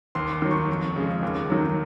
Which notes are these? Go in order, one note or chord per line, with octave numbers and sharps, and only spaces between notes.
D#2 C6
C6
D#3 F#3
C#6
F2
C#3 F3 G#3
D#2
D#3 F#3